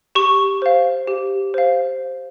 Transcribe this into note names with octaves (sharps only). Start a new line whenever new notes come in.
G4 C#6
C5 F5
G4
C5 F5